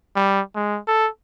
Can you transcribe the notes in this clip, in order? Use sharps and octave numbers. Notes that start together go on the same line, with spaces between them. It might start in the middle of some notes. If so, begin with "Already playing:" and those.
G3
G#3
A4